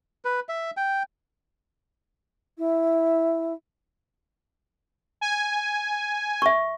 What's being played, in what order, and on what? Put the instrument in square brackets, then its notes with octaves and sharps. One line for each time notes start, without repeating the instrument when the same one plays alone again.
[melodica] B4
E5
G5
[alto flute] E4
[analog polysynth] G#5
[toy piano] E5 C#6